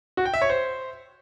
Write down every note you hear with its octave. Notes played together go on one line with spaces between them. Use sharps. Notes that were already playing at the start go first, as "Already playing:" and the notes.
F#4
G5
E5
C#5
C5